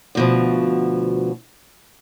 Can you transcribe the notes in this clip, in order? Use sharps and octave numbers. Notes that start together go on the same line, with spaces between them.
D2 B2 F3